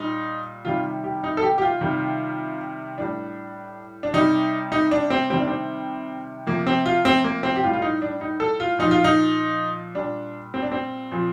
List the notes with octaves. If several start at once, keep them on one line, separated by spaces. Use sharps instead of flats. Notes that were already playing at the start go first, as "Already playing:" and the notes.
Already playing: A#2 G3 D#4
C3 D#3 G3 F4
G4
D#4
A4
G4
G4
F4
C3 D#3 G3
A2 G3 D4
D4
C3 G3 D#4
D#4
D4
C4
C3 D#3 G3 C4
D4
C4
C3 F3 A#3
C4
F4
C4
A#3
C4
G4
A2 G3 F4
F4
D#4
D4
D#4
A4
F4
A#2 F3 D#4
F4
D#4
A#2 G3 D4
C4
D4
C4
A#2 F3